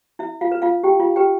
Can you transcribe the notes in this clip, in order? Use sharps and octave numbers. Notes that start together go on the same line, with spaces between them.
E4 E5
F4 F5
B4
F4 F5
E4 G4 G5
F4 F5
G4 B4 G5